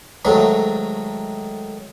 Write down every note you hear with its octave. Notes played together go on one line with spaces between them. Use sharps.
G#2 D#3 F#3 A3